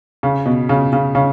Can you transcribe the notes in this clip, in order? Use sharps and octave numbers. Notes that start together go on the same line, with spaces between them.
C#3
B2
C#3
C#3
C#3